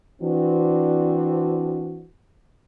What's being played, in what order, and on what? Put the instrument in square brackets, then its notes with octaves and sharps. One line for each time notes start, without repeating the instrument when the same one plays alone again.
[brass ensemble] E3 C4 D4 F#4